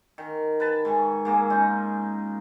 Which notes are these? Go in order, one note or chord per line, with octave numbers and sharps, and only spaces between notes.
D#3
B4 A5
G#2 G#5 C#6
G#2 A#3 G#4
C#4 D#4 F4